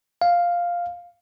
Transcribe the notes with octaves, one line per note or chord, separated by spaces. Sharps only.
F5